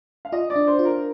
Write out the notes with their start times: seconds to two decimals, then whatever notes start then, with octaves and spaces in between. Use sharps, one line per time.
0.25 F5
0.32 F4 D#5
0.50 D5
0.56 D4
0.67 C5
0.79 F4
0.85 A#4